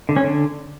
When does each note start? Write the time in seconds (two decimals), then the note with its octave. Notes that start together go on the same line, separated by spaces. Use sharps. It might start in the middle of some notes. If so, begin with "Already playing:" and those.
0.09 D3
0.16 C#4
0.24 D3